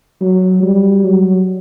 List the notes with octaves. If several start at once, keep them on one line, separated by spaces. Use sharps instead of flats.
F#3
G3
F#3